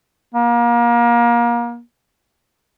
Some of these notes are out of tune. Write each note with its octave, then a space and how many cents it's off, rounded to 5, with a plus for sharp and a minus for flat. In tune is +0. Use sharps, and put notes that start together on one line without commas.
A#3 +30